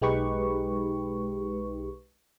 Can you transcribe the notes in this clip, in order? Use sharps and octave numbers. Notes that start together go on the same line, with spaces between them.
B1 G#3 D#4 G4 B4 C#6